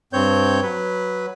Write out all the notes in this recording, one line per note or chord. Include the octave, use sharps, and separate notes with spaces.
G2 C4 C#5 G6
F#3 B4